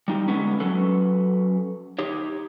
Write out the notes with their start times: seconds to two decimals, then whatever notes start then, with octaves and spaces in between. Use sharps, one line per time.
0.08 G3 D#4 G4
0.28 D3 G#3 B3 C#4
0.60 F#3 C#4 A4 B4
1.99 D#4 G4 C#5